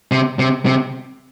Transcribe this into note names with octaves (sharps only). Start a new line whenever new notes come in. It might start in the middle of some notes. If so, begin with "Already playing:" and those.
C3
C3
C3